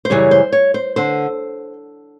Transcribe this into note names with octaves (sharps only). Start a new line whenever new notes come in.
C5
F#2 C#3 E3 G3 C#5
C5
C#5
C5
D3 C5